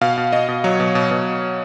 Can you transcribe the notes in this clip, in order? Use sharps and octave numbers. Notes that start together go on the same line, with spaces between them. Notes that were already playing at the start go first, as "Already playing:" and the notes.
B2 F5
B2
B2 D#5
B2
F#3 C#5
B2
B2
B2